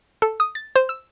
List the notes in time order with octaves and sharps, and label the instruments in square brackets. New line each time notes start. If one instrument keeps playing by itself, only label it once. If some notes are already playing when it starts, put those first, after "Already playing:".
[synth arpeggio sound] A4
D#6
A6
C5
E6